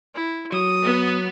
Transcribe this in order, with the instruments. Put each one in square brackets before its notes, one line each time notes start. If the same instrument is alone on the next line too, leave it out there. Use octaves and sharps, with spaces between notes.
[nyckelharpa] E4
[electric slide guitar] F#3 [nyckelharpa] D#6
[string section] B3